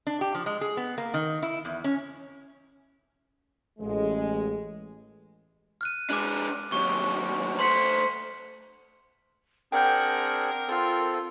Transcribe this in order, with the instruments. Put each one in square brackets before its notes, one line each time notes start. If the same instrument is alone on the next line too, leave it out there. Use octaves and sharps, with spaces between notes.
[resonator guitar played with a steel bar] D4
G4
F3
G#3
G#4
B3
A#3
D#3
E4
E2
C#4
[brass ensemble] A1 G#3
[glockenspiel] F6 F#6 D#7
[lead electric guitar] G#3 D4 [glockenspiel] D6 F#6
[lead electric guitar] D#2 F#3 [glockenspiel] C#6
[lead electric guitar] A3 C5 [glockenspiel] C6 B6 C#7
[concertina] C4 D4 G#4 [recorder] A#4 [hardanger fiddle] F#5 [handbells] G5 G6
[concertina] C4 A4 [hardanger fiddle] F4